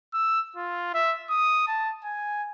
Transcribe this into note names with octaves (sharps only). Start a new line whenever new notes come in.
E6
F4
E5
D#6
A5
G#5